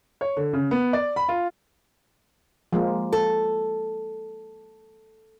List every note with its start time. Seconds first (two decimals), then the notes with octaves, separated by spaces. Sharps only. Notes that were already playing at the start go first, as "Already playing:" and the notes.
0.21 C#5
0.37 D3
0.53 C#3
0.71 B3
0.93 D5
1.16 B5
1.28 F4
2.72 F3 G#3 A#3
3.13 A4